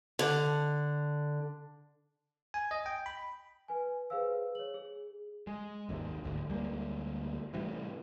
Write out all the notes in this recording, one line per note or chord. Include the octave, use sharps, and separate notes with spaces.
D3
G#5
D#5
G5
B5
B4 G#5
G#4 B4 C5 F5 E6
C#5 F#7
G#4
G#3
G#1 D#2 G#2 C3
D1 G#1 D2
D2 G3 G#3 A#3
A2 C3 E3 G3